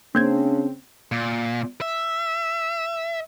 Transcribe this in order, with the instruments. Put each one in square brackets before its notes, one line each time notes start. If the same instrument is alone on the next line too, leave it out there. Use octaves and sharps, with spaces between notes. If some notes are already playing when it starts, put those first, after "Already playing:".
[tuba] C#3 [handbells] A#3 G6 G#6 [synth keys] C4 [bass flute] D4
[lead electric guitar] A#2
E5